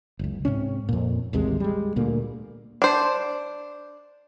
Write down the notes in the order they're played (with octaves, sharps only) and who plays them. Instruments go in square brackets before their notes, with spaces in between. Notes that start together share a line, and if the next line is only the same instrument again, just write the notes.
[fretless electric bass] F#1 C#2
G#2 C3 C#4
F2 A#2
A1 D#2 C3 G#3
G3 G#3
D2 A#2 A3 A#3
[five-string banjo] D4 C5